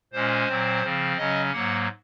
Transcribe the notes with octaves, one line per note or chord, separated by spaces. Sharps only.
A#2 G#3 C#4 C5
A#2 F#3 C4
C#3 F3 C4
C#3 F#3 C#4 D#5
G#2 F#3 A#3 F#5